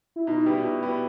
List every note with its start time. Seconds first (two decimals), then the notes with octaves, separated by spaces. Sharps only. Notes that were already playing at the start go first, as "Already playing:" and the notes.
0.16 E4
0.27 B2 D#4
0.46 G3 B3 E4 G4
0.63 B2
0.82 G3 B3 E4 G4